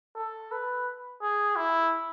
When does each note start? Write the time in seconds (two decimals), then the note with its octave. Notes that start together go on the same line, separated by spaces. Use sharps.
0.15 A4
0.52 B4
1.22 G#4
1.56 E4